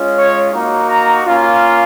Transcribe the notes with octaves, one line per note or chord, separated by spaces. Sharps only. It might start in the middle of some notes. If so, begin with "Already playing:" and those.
Already playing: G#3 C#4 F4
C#5
A#3 D#4 F#4
A#5
A#3 C#4 F4